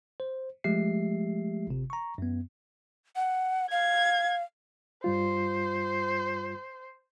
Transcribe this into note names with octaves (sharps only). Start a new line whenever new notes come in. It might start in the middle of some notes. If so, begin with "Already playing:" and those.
C5
F3 G#3 A3 G4 E5 C7
G1 C3
A#5 C#6
F#2 B3
F#5
F5 G#6
G2 G3 F4 C5